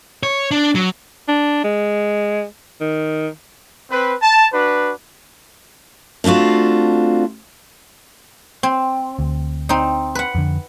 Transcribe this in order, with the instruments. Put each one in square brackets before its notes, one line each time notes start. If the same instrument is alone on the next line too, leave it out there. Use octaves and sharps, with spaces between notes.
[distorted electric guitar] C#5
D4
F#3
[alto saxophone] D4
G#3
D#3
[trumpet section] C4 B4
A5
D4 F#4 B4
[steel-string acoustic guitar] A3 C4 D4 F4 F#4
[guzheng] C4
[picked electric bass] D2
[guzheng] C4 D#4
B4 F#5
[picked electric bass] F2 D3